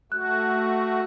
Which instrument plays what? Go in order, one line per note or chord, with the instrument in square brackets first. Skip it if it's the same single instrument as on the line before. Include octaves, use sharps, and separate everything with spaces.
[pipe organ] A3 F#4 [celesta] F#6